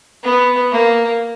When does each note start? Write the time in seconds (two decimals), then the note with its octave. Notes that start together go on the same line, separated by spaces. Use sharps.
0.23 B3
0.72 A#3